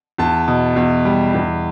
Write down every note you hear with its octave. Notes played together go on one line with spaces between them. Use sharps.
E2 A5
B2
E2
G3
E2